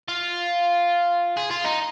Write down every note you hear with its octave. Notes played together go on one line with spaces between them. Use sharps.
F4
G#4
F4
D#4